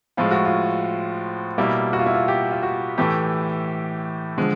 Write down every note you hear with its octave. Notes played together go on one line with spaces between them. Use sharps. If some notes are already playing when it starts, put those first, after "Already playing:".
A2 F3 G#3 F4
F#4
F4
B2 G3 A#3 E4
F#4
F4
E4
F4
G4
F4
F#4
A2 E3 A3 G4
D3 F3 G#3